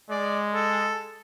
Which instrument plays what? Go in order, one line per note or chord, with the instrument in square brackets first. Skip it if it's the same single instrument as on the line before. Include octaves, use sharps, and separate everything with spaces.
[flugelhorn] G#3 [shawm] D5
[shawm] A4